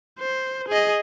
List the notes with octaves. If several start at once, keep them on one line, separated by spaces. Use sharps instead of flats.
C5
G#4 D#5